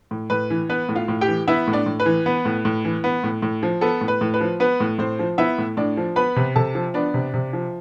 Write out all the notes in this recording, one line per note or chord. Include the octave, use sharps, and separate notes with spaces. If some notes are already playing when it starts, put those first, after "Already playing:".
A2
A2 B4
E3
B3 B4
A2
F4 F5
A2
G4 G5
E3
B3 E4 E5
A2
D4 D5
A2
B4
E3
B3
A2
A2
E3
B3
A2
A2
F3
B3 A4
A2
B4
A2
B4
F3
B3 B4
A2
A2 C4 C5
F3
B3 E4 E5
A2
A2 D4 D5
F3
B3 B4 B5
C3
C3 A4 A5
F3
B3 D4 D5
C3
C3
F3